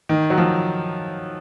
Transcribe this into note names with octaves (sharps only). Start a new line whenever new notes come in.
D#3
F#3
F3